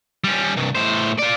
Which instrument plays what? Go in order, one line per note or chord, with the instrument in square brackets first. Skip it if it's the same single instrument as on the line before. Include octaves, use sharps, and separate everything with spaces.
[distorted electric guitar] G3 C#4
C2 G2
A2 C5
F4 D5